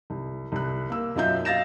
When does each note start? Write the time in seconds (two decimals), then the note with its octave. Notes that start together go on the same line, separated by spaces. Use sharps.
0.10 C2
0.52 C2 F#6
0.90 A#3 E6
1.16 B1 F#2 F4 D#5 E5 G6
1.45 D#5 F5 A6 A#6 E7